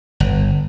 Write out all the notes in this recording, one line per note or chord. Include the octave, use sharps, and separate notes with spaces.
G1